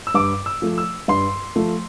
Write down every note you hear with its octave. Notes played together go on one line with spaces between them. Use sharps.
E6
G2 D6
E6
F3 A3
E6
G2 C6
F3 A3